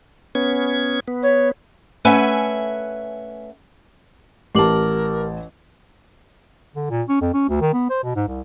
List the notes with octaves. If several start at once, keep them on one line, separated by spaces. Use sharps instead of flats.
B3 C#4 G#6
B3
C#5
A3 C#4 B4 E5 F#5 G#5
A1 G4 A#4 A5 D6 F#7
D3
A#2
C#4
F2
C#4
D2
D#3
B3
C5
B2
G#2
C2